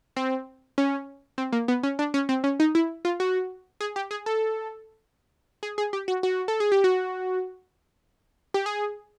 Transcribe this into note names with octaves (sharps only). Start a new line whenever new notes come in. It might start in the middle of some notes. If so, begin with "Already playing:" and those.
C4
C#4
C4
A#3
B3
C#4
D4
C#4
C4
C#4
D#4
E4
F4
F#4
G#4
G4
G#4
A4
G#4
G#4
G4
F#4
F#4
A4
G#4
G4
F#4
G4
G#4